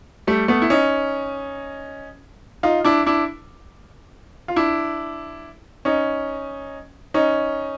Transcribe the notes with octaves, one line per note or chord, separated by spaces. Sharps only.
G3 A3
A3 B3
E4
C#4 D#4
D#4 F4
D4 E4
D4 E4
F4
D4 E4
C#4 D#4
C#4 D#4